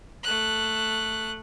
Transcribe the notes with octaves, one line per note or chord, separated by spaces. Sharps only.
A3 F#6